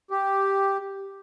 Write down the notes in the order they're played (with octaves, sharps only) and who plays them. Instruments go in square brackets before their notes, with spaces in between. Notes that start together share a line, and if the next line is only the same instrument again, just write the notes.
[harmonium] G4